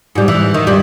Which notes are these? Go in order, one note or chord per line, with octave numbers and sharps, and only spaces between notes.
G#2 G3
E3
D#3
G2 G3